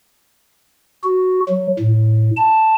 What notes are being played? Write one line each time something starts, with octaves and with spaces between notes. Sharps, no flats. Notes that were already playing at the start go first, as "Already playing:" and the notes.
F#4
F#3
A2
A5